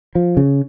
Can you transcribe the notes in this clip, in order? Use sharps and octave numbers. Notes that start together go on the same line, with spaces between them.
F3
C#3